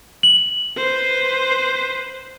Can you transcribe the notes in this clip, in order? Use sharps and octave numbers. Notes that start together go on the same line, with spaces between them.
F#7
B4 C5